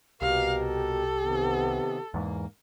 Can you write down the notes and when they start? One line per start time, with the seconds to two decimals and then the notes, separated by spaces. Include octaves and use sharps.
0.22 C2 B2 G4 A#4 F5
0.66 A4
1.24 C3 D#3 B3
2.14 E2 G#2 A#3